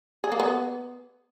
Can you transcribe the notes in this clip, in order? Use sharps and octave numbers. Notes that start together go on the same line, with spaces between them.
G#4
A#3
B3